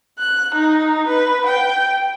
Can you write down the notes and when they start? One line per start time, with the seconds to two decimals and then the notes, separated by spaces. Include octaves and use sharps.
0.19 F#6
0.54 D#4
1.08 B4
1.46 G5